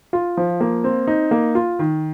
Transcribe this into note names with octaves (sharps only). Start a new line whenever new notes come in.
F4
F3
A#3
C4
D#4
A#3
F4
D#3